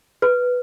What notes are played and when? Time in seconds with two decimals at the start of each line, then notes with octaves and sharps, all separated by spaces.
0.22 B4